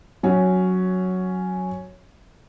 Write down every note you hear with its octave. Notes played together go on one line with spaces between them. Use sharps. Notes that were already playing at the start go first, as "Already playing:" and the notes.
F#3 C#4